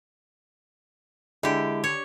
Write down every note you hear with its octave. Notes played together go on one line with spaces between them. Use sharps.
D3 G#3 E4 G4
C#5